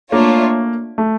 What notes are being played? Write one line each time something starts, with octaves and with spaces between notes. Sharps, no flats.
A3 A#3 D4 F4 C#5
A3